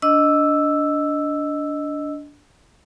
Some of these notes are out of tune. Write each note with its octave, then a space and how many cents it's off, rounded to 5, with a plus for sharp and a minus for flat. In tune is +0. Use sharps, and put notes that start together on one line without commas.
D4 -15 D#5 +0 E6 +0